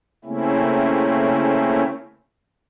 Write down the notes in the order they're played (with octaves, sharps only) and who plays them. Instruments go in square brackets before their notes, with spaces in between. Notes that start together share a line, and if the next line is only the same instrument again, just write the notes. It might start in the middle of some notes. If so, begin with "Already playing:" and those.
[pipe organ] C#3 A3 A#3 C4 C#4 E4